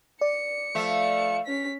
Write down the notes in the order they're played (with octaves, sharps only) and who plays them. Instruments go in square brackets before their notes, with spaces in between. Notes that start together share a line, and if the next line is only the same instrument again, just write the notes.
[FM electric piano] D5 [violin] C#7
[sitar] F3 E5 [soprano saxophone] A3
[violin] C#4 B6